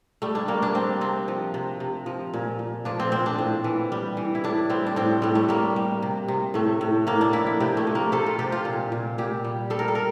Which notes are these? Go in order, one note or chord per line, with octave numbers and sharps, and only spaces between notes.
G3 A3
D4
G3 A#3
D4
G3 C4
C3 C4
F3
C3
C3
F3
A#2
A#2
F3 D4
C4
A#2 C4
D4
A2
E3
G3
E3
E4
A2 D4
G3 C4
D4
A2 C4
A2 G3
A3
G3 A#3
G3
C3
C3
A2 A3
A2
A2 A#3
D4
F3 E4
E4
C3 G4
A3
F3
A#3
C3 A4
F4
C3 G4
F4
A#2
A#2
A#2 G4
G3
G3 A4
A#4
A4
A#4